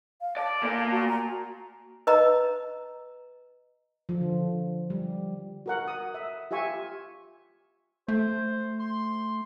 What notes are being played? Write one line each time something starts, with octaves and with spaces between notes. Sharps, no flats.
F5
D5 A5
A#3 D5
F#4
A#5
B4 D#5 A#5
F3
D3
G3
F#4 A#4 F#5
D#6
E5
F4 G4 E5 G#5 C#6
A3 C5
C6